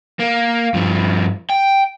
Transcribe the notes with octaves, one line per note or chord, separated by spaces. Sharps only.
A#3
G2 F3
G5